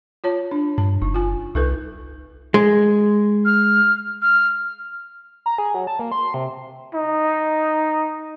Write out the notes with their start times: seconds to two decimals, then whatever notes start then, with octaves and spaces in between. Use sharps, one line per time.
0.24 F4 C#5 A5
0.51 D4
0.78 G2 A5
1.02 F#1 D#4
1.14 F4 G#5
1.55 C2 D#4 A4 B4
2.54 G#3
3.45 F6
4.22 F6
5.46 A#5
5.58 G#4
5.74 F#3
5.87 A5
5.99 A#3
6.12 C6
6.34 C3
6.95 D#4